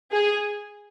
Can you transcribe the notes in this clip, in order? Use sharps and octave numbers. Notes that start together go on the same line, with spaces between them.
G#4